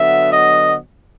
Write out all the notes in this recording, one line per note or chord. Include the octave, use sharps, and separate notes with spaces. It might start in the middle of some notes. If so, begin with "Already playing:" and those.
Already playing: D3 F#3 B3 E5
D#5